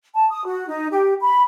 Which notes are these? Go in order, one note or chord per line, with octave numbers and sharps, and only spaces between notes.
A5
D#6
F#4
D#4
G4
B5